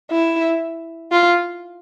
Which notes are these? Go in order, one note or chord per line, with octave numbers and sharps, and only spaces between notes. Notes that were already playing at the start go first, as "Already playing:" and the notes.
E4
F4